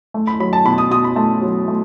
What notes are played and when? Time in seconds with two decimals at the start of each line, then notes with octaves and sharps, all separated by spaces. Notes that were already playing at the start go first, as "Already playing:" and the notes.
0.14 A3
0.27 B5
0.40 F#3 B5
0.53 A5
0.65 B2 B5
0.78 D#6
0.91 B2 D#6
1.04 B5
1.16 A3 A5
1.42 F#3
1.68 A3